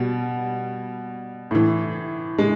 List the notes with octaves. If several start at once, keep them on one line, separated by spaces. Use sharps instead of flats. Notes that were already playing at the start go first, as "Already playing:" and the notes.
Already playing: B2 G3
A2 E3
G#3